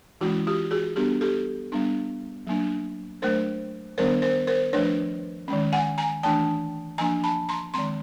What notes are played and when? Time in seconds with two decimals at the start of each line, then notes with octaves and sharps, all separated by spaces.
0.21 E3 G#3 C#4 E4 F#4
0.47 F4 G4
0.71 F#4 G#4
0.96 G3 B3 D4 G4 A4
1.21 G4 A4
1.72 G3 B3 D4
2.47 F#3 A#3 D4
3.22 F#3 A3 D4 A#4 C5
3.98 D#3 G3 B3 D4 A#4 C5
4.22 A#4 C5
4.47 A#4 C5
4.73 F3 A3 D4 B4 C#5
5.48 D#3 G#3 C#4
5.73 F#5 G#5
5.98 G#5 A#5
6.23 E3 A3 D4 G5 A5
6.98 F3 A#3 D4 G#5 A#5
7.24 A5 B5
7.49 A#5 C6
7.74 D#3 G#3 C4 A#5 C6